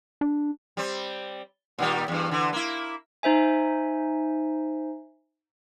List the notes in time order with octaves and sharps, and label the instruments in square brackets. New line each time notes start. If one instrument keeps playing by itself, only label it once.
[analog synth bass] D4
[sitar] G3 C4
A#2 D#3 G3
E2 G2
D3 E3
A#3 E4
[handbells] D#4 C5 E5 G#5